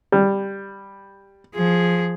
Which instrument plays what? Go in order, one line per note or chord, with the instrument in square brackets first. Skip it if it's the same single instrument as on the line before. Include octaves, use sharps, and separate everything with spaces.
[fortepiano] G3
[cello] F3 G#4